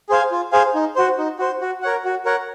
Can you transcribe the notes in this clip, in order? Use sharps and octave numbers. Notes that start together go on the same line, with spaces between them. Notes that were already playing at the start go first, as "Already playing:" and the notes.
G#4 C5 F5 G#5
F4
G#4 C5 F5 G#5
D#4
F#4 C5
D#4
F#4 C5
F#4
A#4 C#5 F#5
F#4
A#4 C#5 F#5